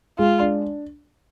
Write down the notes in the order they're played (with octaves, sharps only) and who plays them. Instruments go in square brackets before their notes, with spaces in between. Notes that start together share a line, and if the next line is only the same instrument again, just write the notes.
[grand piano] G#3 [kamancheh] F4
[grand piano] D4